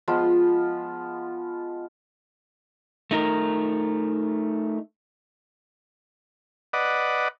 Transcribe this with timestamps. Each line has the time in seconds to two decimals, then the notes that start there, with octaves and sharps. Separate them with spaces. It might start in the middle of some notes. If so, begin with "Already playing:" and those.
0.08 F3 G#3 B3 F4
3.11 A3 D#4 A#4
6.73 B4 D5 D#5 F#5